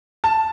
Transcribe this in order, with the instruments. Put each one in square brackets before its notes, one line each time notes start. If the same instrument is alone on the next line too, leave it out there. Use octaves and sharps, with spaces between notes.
[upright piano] A5